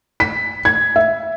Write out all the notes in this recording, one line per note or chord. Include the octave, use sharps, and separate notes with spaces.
B6
G#6
E5